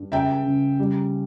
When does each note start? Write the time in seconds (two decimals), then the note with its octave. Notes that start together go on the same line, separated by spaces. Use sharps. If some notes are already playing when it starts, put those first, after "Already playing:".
Already playing: G2
0.12 C#2 E5 G5
0.45 C#3
0.79 G3